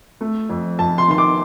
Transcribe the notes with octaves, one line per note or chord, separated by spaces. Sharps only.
A3
F2
F2 A5
C6
D#3 C6
D6